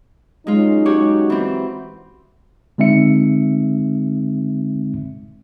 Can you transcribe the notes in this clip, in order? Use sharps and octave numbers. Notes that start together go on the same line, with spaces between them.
F#3 G#3 C#4 D#4 F4
F#4 G4 C#5
E3 C4
D3 G#3 C4 D#4 E5 C#7